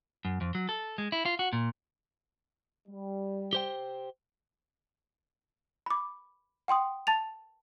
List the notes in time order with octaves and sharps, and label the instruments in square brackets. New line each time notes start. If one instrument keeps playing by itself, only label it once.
[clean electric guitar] F#2
F2
F#3
A4
G#3
E4
F4
F#4
A#2
[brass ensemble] G3
[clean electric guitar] G4 C5 G5
[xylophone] B5 D6
F#5 G5 C6 D#6
A5 A6 F7